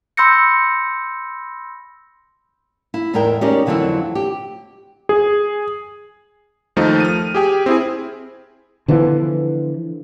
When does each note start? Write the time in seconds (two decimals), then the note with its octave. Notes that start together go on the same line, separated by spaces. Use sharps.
0.17 B5 C6 E6 G6 A#6 C#7
2.94 E4
3.13 E2 A2 G#3 A#4 E5 G5
3.41 C#4 D#4 G4 G#4 A#4 D5
3.66 F2 D3 E3 F#3 C4 E4
4.15 G4
5.09 G#4
6.76 D#2 F3 A3 D#4
7.00 F6 D#7
7.35 G4 G#4 G5
7.66 C4 E4 G#4
8.88 D3 E3 F3 B3